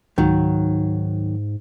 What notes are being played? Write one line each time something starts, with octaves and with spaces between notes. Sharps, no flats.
C#2 G#2 D#3 F#3